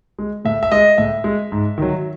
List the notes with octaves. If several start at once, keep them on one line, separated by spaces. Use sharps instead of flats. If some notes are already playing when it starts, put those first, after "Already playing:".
G#3
A2 E5
E5
G#3 D#5
A2 E5
G#3
G#2
D#3 F#3